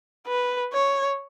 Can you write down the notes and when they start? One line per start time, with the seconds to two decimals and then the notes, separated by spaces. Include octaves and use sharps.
0.27 B4
0.73 C#5